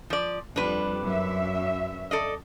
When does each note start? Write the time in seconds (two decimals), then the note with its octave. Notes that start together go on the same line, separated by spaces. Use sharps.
0.10 F3 D5
0.56 F2 G3 D4 B4
1.04 F#2 E5
2.11 A4 D5 D#5